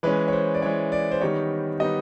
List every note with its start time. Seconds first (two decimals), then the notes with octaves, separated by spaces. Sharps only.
0.03 E3 G#3 C#4 B4
0.28 C#5
0.33 C5
0.54 D5
0.62 E3 G#3 C#4 C#5
0.92 D5
1.12 C5
1.21 D#3 G3 B3 D#4 C#5
1.79 D#3 G3 B3 D#4 D#5